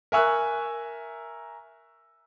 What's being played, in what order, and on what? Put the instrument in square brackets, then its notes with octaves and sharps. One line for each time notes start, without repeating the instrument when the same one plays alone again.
[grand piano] A#4 E5 G#5 C#6 E6 F#6